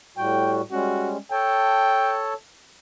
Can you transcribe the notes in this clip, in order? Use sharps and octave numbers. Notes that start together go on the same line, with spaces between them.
A2 G3 F#4 G5
G3 G#3 C#4 F#4
A4 C#5 G5 A5